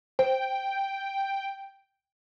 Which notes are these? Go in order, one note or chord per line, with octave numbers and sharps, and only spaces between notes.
C5 G5